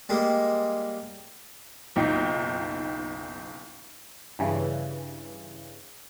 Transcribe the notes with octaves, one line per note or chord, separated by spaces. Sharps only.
G3 G#3 A#3
F#1 B1 D#4 F4 G5
G2 C#3 E3